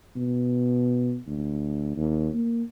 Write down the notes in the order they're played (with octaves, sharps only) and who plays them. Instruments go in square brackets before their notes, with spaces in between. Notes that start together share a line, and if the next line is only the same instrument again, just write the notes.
[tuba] B2
D2
D#2
A#3